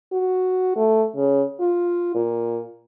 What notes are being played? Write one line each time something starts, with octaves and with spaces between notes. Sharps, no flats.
F#4
A3
C#3
F4
A#2